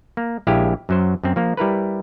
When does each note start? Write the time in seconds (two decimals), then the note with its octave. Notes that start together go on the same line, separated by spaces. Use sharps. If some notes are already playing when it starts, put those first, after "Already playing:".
0.17 A#3
0.47 A#1 G#3 E4 G4 F5 G#5
0.89 F#2 F#3 C5
1.23 F#2 C4
1.36 F3 A#3
1.57 G3 E4 A#4 B4